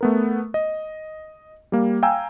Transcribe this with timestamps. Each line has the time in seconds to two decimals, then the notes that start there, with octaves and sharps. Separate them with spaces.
0.01 A3 B3 A#4
0.54 D#5
1.72 G3 A#3
2.03 F5 G5 G#5 A#5 E6